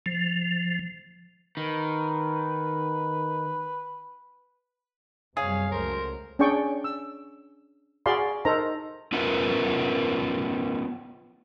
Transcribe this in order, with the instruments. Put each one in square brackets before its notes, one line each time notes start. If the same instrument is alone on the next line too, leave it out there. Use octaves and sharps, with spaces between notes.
[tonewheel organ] F3
[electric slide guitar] D#3 [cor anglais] B4
[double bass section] F#2 C3 G3 [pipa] G#4 [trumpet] C#5 [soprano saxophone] F5
[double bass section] C#2 F#3 A3 [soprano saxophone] A#4 [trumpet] C5
[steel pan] C#4 D4 G#4 D5 G5 C#6
E6
F#4 G#4 D5 F5 B5 C6
D#4 A4 A#4 C5 A#5
[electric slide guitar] B3 C#4 F4 A#4 B4 E5